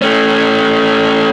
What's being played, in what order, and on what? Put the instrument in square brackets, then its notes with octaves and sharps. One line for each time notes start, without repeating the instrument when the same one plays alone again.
[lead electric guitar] A3 C#4